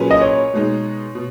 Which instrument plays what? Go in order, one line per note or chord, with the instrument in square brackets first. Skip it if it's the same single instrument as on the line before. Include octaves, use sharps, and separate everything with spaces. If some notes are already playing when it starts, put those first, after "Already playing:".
Already playing: [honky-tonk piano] A#2 F#3 C#4 G#4 B4
[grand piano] D#5
C#5
[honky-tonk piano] B2 G#3 D#4
B2